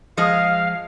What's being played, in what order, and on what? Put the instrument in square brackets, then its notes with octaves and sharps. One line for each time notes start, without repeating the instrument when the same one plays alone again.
[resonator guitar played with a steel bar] F3 G#3 D#5 [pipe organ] F5